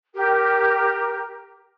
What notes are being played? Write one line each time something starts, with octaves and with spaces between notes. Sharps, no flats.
G4 A#4